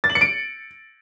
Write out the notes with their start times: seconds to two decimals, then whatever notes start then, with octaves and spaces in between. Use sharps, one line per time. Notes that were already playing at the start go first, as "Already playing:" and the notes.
0.04 A6
0.10 F#7
0.15 C#7
0.21 D7